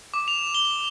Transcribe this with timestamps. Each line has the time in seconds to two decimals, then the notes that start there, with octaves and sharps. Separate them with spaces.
0.14 D6
0.28 F7
0.55 G7